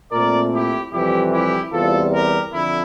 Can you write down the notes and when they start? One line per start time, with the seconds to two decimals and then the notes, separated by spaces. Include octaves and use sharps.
0.11 A#2 A3 C4 A#4 D5
0.52 E4 G4
0.92 F2 C3 E3 G3 E4 G4
1.32 E4 G4
1.72 E2 C3 G3 F4 A4
2.13 G4 A#4
2.52 F2 D3 E4